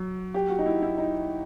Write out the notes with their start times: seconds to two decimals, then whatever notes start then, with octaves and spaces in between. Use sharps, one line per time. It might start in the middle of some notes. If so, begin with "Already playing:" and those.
Already playing: F#3
0.34 G4
0.49 F#4
0.59 D#4
0.66 E4
0.82 E4
0.98 D#4